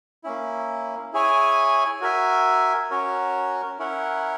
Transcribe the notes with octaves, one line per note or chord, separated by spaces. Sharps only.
A#3 C#4 E4
E4 G#4 C#5 G#5
F#4 A#4 E5 G#5
C#4 F#4 A#4 C#5
C#4 E4 A#4 C#5 F#5